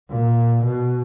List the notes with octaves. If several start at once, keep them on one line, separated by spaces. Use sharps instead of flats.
A#2
B2